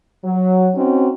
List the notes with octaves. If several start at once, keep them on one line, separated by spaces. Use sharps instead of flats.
F#3
C4 C#4 D#4 F#4